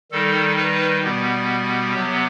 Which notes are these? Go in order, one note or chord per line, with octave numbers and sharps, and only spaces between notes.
D#3 G3 D#4 A4
B4
B2 G3 B3 G4
C3 F#3 B3